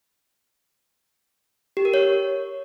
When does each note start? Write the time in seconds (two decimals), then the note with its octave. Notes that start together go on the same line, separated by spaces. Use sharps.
1.77 G4
1.85 A#4
1.94 C#5